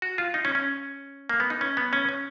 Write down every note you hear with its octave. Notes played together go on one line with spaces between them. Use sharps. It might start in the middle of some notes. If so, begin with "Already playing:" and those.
F#4
F4
D#4
C#4
C#4
A#3
B3
D#4
C#4
B3
C#4
C#4